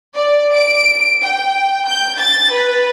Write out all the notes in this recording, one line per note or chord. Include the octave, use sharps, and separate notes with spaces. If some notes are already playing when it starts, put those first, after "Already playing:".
D5
D7
G5
G6
A6
B4